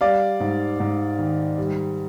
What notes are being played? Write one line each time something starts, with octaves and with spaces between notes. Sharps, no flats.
G3 D5 F5
G#2
G#2
D#3
G3